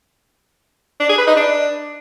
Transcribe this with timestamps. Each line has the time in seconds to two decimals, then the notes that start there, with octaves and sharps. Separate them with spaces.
1.00 D4
1.09 G#4
1.18 B4
1.27 D#4
1.36 D4